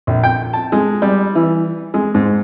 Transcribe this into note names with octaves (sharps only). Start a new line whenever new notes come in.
A#1
G5
A5
G#3
G3
E3
G#3
G#2